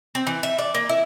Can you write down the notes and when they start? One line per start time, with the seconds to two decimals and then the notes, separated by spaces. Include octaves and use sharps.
0.15 C4
0.27 E3
0.43 E5
0.58 D5
0.75 A#3
0.89 E4